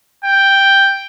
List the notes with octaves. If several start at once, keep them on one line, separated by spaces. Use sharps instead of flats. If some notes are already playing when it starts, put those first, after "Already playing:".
G5